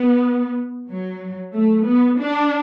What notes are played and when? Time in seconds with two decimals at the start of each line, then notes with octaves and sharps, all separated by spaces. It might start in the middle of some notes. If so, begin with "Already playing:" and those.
Already playing: B3
0.88 F#3
1.54 A3
1.86 B3
2.21 D4